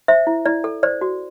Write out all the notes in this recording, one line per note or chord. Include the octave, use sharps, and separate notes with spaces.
C5 E5
E4
E4 D5
A4
C5 D5
F#4